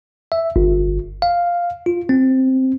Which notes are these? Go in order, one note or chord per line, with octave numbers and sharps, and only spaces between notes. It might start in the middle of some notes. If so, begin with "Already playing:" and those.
E5
G1
F5
F4
C4